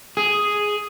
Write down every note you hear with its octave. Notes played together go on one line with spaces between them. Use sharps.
G#4